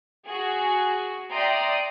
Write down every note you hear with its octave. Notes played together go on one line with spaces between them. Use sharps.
F#4 G#4
D5 E5 G5 A#5 C6 D#6